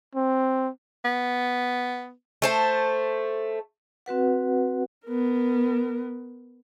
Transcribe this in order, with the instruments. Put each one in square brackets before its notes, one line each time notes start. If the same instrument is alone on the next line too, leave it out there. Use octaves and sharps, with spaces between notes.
[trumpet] C4
[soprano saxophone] B3
[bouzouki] A3 C5 A5
[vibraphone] C4 F#4 B4 F#5
[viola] B3 A#4